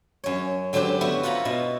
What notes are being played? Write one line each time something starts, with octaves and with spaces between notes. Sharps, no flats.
F#2 C#5
D3 F#3 C4 G4 B4
B3 E4 F#4
F4 B4 F#5 A#5 B5
B2 E4